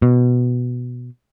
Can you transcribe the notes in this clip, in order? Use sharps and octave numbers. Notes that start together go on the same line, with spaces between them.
B2